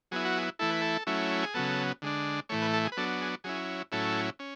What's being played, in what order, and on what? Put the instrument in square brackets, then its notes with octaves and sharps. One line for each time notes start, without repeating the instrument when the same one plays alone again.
[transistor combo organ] F#3 B3 E4 G#4
F#4
G#4
E3 A3 E4 A4
B4
A4
F#3 A3 C#4 E4
G#4
C#3 F#3 B3 A4
D3 G#3 D4
A2 E3 A3 C#5
B4
A4
G#4
B4
F#3 B3 D4 A4
G#4
F#3 C#4 E4 G#4
A2 F#3 C#4 E4 A4
C#4